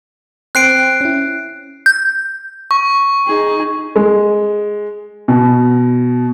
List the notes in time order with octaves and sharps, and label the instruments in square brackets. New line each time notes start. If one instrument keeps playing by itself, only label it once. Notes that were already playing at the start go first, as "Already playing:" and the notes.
[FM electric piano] C4 C5 G5 [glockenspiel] F#6 C7 D7
[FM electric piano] C#4 E4
[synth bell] G6
[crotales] C#6
[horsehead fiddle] D#4 G#4
[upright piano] G#3
B2